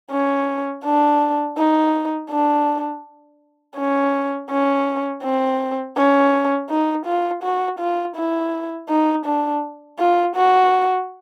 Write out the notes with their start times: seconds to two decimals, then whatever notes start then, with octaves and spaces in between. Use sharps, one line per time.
0.11 C#4
0.84 D4
1.57 D#4
2.30 D4
3.77 C#4
4.50 C#4
5.23 C4
5.97 C#4
6.70 D#4
7.06 F4
7.43 F#4
7.79 F4
8.16 E4
8.89 D#4
9.25 D4
9.99 F4
10.36 F#4